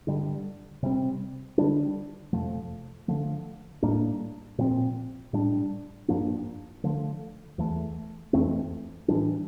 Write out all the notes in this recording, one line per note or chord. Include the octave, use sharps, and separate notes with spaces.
G2 D3 G3
C3 G3 C4
D3 G3 D4
F2 C3 F3 A3
D3 F3 A3
A2 G3 A#3 D4
A#2 F3 C4
A2 G3 D4
G2 F3 A#3 D4
D3 F3 A3
E2 E3 A3
F2 E3 A3 C4
A2 E3 G3 D4